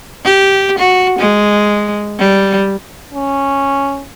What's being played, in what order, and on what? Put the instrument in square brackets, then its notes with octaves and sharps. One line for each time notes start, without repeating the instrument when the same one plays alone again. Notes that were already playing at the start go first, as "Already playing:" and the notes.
[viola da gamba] G4
F#4
G#3
G3
[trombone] C#4